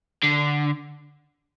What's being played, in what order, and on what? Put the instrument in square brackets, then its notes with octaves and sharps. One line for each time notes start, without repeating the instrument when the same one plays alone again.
[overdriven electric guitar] D3